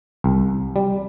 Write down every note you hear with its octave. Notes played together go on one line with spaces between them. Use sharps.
C2
G3